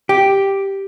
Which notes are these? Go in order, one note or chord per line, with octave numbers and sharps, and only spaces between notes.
G4